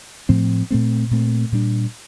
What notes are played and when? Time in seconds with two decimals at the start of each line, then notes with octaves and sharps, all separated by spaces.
0.29 A2 F3 A3 C4
0.71 A#2 A3 C4
1.11 A#2 A3 C4
1.52 A#2 G3 D4